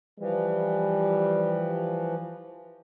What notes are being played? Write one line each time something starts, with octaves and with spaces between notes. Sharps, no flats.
E3 F3 G3